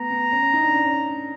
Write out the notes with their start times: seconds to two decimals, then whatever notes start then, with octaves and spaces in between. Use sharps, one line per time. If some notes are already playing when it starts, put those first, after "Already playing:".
Already playing: A3 B3 A#5
0.10 B3
0.32 C#4
0.42 C#4
0.53 D#4
0.63 D4
0.74 D4
0.85 C#4